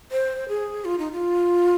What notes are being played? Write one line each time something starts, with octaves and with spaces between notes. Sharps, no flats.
C5
G#4
F4
D#4
F4